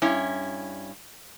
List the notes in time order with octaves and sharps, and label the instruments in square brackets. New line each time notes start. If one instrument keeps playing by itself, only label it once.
[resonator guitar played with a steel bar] G2 C#4 E4